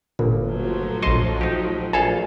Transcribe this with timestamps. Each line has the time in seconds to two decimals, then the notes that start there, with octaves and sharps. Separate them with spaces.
0.19 G1 A#2
0.49 F3 F#3 A3
1.03 A#1 D#5 A5 C6
1.41 D#4 G4
1.93 A#1 A4 F5 G#5